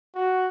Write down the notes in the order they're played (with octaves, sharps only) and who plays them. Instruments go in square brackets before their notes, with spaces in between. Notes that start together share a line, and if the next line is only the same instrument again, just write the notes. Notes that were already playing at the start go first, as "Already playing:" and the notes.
[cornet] F#4